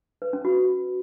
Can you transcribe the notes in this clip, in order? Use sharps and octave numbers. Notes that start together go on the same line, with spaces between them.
B4
C#4
F#4